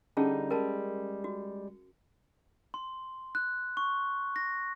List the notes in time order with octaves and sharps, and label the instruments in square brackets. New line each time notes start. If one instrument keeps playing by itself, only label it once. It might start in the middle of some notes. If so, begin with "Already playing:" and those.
[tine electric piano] D3 G3 D#4 [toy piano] C#4 G#4 A5
[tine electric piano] G3 G#3 [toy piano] A#4 A5
[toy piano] F#4
[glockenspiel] C6
F#6
C#6
A#6